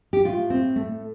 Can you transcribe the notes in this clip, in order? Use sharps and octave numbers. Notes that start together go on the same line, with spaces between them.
G4
A2 F4
C4
A3